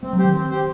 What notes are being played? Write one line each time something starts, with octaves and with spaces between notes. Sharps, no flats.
A3 C4
F#3
G4 C5
D#3
C4
G4 C5